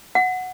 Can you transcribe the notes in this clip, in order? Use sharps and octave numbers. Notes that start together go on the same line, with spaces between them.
F#5